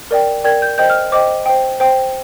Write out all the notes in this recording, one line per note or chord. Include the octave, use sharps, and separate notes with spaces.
A#4 D5 G5
A#4 D5 G5 G#6
G6
C5 D#5 G5 G6
F6
C5 D#5 G5 D6
C5 G5
C5 G5